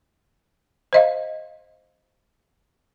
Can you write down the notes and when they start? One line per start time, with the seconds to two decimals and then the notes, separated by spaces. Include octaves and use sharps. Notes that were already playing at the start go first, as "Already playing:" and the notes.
0.93 C5 D#5 F5